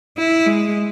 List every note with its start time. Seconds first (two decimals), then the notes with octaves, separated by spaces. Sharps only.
0.17 E4
0.46 G#3